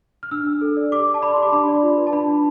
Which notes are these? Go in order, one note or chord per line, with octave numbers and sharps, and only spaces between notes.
F6
D4 E6
D4
A4
D5
G4 D6
D5
A5
D5 B5
G4 C6
D6
D4 B5
D5
F4
B4
A5
D4 B5
D4